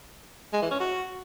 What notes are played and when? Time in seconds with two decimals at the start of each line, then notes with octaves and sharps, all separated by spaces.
0.53 G#3
0.62 E3
0.71 C#4
0.80 F#4